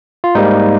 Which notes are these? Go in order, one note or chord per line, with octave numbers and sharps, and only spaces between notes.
F4
G#2 G3 A#3 D#4